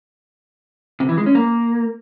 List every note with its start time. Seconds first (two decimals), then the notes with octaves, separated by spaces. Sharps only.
1.00 C3
1.09 E3
1.18 G#3
1.26 C#4
1.35 A#3